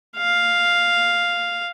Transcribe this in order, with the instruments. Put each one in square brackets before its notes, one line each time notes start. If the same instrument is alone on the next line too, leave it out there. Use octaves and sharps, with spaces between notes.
[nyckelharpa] F5